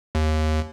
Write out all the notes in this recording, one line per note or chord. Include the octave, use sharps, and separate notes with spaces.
D#2